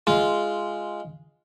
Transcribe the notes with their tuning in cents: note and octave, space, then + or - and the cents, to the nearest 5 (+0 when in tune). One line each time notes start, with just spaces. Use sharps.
G#3 +0 F4 -10